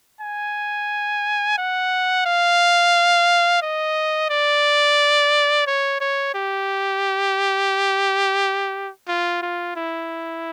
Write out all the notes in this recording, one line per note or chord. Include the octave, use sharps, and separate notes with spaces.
G#5
F#5
F5
D#5
D5
C#5
C#5
G4
F4
F4
E4